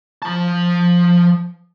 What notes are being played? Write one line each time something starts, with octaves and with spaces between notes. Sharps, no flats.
F3 A5